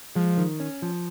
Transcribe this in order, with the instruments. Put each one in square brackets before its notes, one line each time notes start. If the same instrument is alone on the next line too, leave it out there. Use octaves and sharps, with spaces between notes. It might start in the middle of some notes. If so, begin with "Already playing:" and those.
[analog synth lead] F3 [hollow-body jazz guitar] G#3
[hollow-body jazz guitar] D#3
C#4
F3